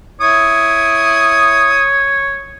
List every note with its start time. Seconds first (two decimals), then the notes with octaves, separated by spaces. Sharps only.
0.21 E4 C#5 D#6